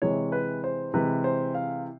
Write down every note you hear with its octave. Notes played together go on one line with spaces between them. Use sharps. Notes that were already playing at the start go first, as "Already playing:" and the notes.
C3 E3 G#3 C#5
B4
C5
C3 E3 G#3 B4
C5
F5